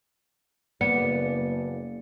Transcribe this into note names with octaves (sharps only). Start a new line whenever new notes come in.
F#1 A#3 B3 D5 C#7